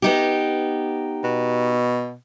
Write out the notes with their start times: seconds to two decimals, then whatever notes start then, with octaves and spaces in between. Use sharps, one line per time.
0.02 B3 D#4 G4
1.24 B2